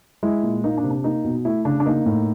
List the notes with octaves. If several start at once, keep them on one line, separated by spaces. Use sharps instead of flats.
G#3 E4
A#2
A#3 D#4
D4
C3
D4
A#3 D#4
B2
A3 E4
C#3 D4
D4
A#3 D#4
A2